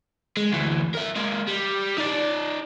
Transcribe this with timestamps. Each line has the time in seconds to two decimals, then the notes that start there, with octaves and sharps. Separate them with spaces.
0.37 G#3
0.52 D2 E3
0.94 A#4 E5
1.16 G#3 A#3
1.48 G3
1.98 D#4 D5